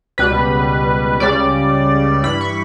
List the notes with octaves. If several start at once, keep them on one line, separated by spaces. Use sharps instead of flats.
C#2 B2 G3 B4
C#2 C#3 G3 D5
G2 E3 G3 B5
C#6